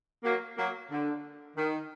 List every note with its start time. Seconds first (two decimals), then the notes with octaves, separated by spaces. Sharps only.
0.24 F#3 A#3
0.57 F#3 A#3
0.91 D3
1.57 D#3